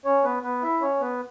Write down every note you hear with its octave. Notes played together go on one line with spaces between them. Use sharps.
C#4 C#5
B3 B4
B3 B4
E4 E5
C#4 C#5
B3 B4